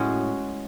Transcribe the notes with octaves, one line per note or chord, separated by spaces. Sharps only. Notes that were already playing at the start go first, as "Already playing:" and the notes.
Already playing: A2 G#3 C#4 F#4